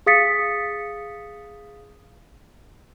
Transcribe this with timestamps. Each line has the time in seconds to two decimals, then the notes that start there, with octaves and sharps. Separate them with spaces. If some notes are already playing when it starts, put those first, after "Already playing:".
0.06 G#4 F5 D#6 A6 B6 C#7